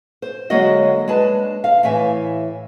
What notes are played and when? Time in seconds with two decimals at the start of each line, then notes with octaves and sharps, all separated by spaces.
0.22 C5
0.50 D3 F#3 G#3 A#3 F#4 D#5
1.08 G#3 D4 B4 A5
1.64 F5
1.83 A2 E3 E5 G#5